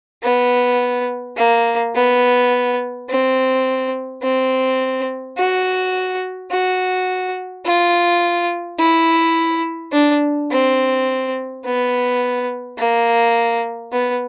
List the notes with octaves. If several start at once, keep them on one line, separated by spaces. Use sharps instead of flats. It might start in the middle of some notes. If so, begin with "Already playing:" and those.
B3
A#3
B3
C4
C4
F#4
F#4
F4
E4
D4
C4
B3
A#3
B3